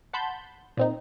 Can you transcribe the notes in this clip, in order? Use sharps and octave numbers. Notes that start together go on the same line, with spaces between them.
F#5 A5 B5 C6 G6
A#2 C4 D#4